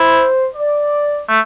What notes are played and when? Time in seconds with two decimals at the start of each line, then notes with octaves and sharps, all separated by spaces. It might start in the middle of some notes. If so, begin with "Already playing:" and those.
Already playing: E4 C5
0.55 D5
1.29 A3